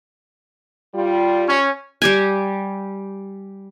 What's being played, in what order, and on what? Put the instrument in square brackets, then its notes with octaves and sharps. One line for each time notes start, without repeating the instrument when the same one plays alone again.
[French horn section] G3 F4
[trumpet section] C#4
[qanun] G3 G4 G#5